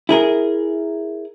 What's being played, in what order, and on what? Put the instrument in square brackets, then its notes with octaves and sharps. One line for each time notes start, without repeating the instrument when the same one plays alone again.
[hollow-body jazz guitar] E4 G#4 A#4